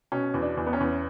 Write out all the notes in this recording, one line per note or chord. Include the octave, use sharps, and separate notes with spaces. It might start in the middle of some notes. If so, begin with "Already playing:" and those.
B2 C#4
E2
D4
E2
B3
C#4
E2